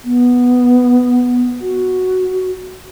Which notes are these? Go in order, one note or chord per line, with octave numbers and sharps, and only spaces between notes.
B3
F#4